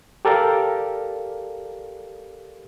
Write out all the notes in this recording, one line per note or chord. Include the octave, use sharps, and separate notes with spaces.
G4 A4 A#4 D5 F5